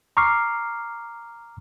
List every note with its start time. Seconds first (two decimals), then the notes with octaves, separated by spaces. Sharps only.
0.17 A#5 C#6 D6 F6 C7